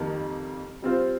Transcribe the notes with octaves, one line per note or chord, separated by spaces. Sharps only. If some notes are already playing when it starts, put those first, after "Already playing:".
Already playing: F2 D#3 G3 A#3
G3 C4 F4 C5